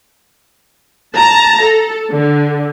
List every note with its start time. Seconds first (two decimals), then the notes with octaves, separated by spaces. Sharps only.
1.15 A5 A#5
1.62 A4
2.10 D3